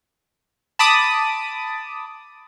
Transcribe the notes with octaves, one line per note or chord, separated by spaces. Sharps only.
A5 B5 D6 D#6